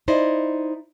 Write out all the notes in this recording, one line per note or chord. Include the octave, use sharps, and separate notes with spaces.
D#4 E4 C5 D5 D#5